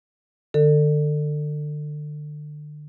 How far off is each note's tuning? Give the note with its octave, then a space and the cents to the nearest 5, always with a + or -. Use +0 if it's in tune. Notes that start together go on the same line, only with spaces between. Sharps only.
D3 +30 A4 +30